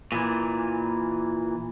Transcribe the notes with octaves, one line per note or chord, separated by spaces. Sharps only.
A#2 E3